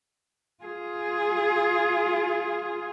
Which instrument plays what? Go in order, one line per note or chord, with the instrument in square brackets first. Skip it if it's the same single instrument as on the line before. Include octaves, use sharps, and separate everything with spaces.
[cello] F4 G#4